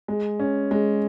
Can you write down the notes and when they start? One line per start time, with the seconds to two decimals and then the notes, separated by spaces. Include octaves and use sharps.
0.08 G#3
0.39 C#4
0.71 G#3